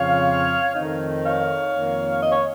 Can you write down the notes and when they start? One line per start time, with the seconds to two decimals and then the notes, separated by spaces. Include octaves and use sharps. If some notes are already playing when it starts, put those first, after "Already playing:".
Already playing: F2 C#3 F3 C4 C#5 F5
0.75 F2 D#3 A3 C4 D#4
1.23 C#5 F5
1.72 F2 D#3 A#3
2.20 D#5
2.31 C#5